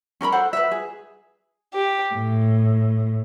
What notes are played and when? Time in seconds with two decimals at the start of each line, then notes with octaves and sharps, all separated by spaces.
0.21 C#4 A#4 D5 B5
0.32 A4 C5 F#5
0.53 B4 E5
0.71 G#4
1.74 G4
2.14 A2